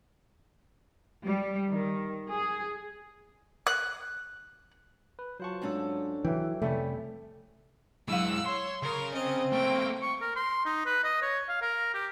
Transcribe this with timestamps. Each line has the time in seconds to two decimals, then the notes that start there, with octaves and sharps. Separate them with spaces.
1.25 G3
1.70 D#3
2.28 G#4
3.67 F#6
5.19 B4
5.40 F#3 F4 C5 F#5 A5 C#6
5.62 G#2 C#4 D4 A4 A#5
6.25 E3 F#3 E5 G5
6.62 F2 C3 G3 A3 C#4
8.08 F#3 G#3 E4 F5 F#5 E6
8.46 C#5 C6
8.82 C#3 A#4
9.14 C4 D#5
9.53 A3 A#3 G5
10.02 C#6
10.22 A#4
10.36 C6
10.65 D#4
10.86 B4
11.04 D#5
11.22 C#5
11.49 F5
11.62 A#4
11.94 G4